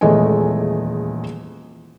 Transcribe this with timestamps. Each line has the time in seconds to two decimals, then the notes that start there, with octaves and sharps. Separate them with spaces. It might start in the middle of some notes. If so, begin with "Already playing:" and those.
0.01 D#1 E2 G#3 A3 D#5 G#5